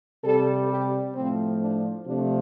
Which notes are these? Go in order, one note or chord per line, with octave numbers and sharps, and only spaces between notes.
C3 G3 A4
G4
A2 F3 A3 C4
D4
C3 F3 A3 D4